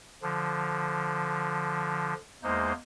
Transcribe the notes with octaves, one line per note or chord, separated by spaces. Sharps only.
D3 F3
E2 G#3 A#3 D#4 C5